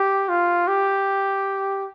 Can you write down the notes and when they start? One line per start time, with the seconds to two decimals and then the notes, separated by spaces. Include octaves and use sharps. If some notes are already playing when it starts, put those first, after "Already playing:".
Already playing: G4
0.29 F4
0.68 G4